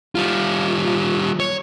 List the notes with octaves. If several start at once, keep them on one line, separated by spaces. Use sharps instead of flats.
G3 F4
C#5